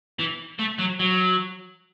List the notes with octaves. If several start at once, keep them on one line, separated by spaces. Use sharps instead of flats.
E3
A3
F#3
F#3